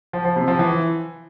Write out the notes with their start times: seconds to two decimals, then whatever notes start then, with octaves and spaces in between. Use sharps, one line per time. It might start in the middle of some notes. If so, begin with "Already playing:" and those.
0.13 F3
0.25 F3
0.36 C3
0.48 F3
0.59 E3